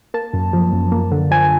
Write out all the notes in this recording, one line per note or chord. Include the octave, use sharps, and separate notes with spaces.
A#3 A5
F#2
F3
F#2
A#3
D3
F3 G#5